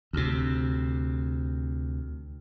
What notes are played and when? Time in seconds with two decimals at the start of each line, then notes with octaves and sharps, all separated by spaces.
0.13 D2 C3